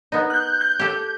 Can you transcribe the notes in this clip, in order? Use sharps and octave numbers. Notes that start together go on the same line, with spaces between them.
B3 D#4
F#6 G6
G6
G4 A4